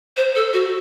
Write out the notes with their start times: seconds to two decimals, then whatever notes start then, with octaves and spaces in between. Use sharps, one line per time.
0.16 C5
0.35 A4
0.53 F#4